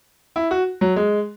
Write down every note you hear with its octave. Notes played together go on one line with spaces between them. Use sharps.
E4
F#4
F#3
G#3